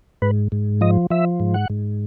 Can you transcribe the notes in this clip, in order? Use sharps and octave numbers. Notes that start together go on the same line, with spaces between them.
G#2 B4
G#2
F3 D#5
F3 E5
G#2
F#5
G#2